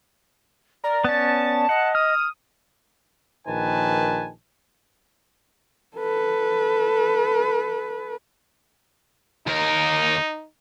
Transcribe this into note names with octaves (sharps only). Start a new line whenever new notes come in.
A#4 D5
B3 C#4 A5
D#5 F#5
D#6 F6
A#1 D#3 B4 G#5 A5
A4 B4
D#2 D#4 A#4